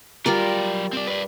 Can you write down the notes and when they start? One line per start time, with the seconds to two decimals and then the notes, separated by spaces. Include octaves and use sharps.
0.26 F#3 G3 F4 A#4 D5
0.93 C4 D5
1.07 B4 D5